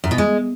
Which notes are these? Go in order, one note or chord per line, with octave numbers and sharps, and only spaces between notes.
F#2
B2
G#3